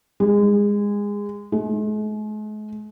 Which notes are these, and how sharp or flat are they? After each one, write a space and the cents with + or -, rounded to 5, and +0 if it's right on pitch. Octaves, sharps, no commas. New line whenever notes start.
G#3 -20
G#3 +45